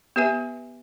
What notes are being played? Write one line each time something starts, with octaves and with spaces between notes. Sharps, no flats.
B3 G4 B4 E5 G#5